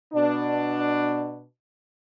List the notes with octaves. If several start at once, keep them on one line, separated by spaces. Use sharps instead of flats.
B2 D4